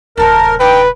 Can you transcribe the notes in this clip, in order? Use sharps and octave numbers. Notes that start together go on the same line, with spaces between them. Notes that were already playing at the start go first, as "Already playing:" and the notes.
D1 C3 D4 A4 A#4 C5
D#4 B4 D5 G5 A#5